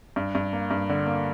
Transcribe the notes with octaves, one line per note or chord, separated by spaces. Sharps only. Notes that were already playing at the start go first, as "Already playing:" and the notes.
G2
G2
A#3
G2
D3
A#3